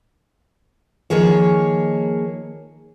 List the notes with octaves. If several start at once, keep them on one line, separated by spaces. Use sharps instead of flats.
D#3 F3 A#3 G#4 C#5